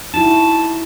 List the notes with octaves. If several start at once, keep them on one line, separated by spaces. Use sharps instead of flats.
D#4 E4 F#4 A5